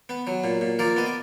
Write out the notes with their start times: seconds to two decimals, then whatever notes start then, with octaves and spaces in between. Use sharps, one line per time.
0.09 B3
0.27 F#3
0.44 A#2
0.61 A#2
0.79 F3 A#4 D5
0.97 B3 D#5
1.06 D5